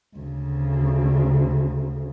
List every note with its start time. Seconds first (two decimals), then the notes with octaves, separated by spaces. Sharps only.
0.17 D2 C#3